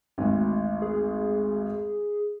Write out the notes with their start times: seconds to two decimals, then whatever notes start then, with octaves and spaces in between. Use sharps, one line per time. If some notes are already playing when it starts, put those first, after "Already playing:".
0.18 G#1 D2
0.82 G#4